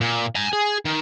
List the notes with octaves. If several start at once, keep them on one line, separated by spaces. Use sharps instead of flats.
A#2
G#5 A#5
G#4
D#3